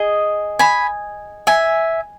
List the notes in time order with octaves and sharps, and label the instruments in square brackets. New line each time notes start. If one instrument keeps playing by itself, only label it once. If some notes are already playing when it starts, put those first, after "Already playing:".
Already playing: [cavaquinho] G#4 D#5
G#5 B5
E5 G#5